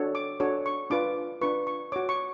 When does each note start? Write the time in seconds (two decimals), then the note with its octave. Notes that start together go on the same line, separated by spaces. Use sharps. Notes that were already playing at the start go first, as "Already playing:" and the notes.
Already playing: D4 F#4 A4 C#5
0.15 D6
0.40 D4 F#4 A4 C#5
0.66 C#6
0.90 D4 F4 B4 D6
1.41 D4 F4 B4 C#6
1.67 C#6
1.92 F#4 C#5 D6
2.09 C#6